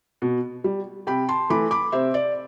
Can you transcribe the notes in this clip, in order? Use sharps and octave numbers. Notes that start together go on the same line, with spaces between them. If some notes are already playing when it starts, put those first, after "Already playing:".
B2
G3
C3 G5 B5
A5 C6
E3 A3 B5 D6
B5 D6
C3 C5 E5
D5